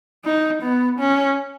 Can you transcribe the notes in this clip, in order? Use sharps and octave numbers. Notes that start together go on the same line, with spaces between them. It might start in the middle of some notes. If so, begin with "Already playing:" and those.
D#4
B3
C#4